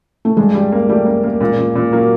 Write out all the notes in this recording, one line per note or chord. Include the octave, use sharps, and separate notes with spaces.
A3
G2 G#3
G3
A#3
G3 A3
A#3
A#3
A#2 G#3
A#2
A#2
F#3 A#3